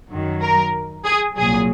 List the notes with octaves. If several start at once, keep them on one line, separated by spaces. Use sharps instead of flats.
F#2 D#3 F#3
A#4
G#4
C2 A#2 F#3 G#4